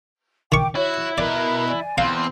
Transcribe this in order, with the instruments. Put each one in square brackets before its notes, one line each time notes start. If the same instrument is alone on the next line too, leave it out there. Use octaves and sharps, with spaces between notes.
[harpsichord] D#3 C#6 [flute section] G5 D6
[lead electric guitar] E4 [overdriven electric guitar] F#4 [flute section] C#5
[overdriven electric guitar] B2 B4 [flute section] A#4 [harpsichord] D5
[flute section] D5 G#5
[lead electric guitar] E2 [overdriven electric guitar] C4 [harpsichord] F5 [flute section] C6